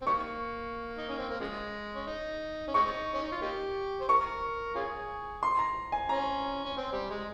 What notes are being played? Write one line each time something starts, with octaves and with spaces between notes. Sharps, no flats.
C4
D#3 G3 A#3 C#6
D#4
C#4
C4
A#3
C#3 F3 G#3
C#4
D#4
C#4
G#3 C4 D#4 C#6
C#4
D#4
F4
A#3 D#4 G4
C5
A#4 C#6
C#4 F4 G#4
C6
A#5
G#5
C#4 A#5
C#4
C4
G3
G#3